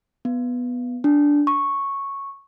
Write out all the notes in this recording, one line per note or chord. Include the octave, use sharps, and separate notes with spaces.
B3
D4
C#6